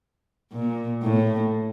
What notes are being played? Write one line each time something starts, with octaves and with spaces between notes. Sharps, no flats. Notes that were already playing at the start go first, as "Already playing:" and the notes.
A#2
A2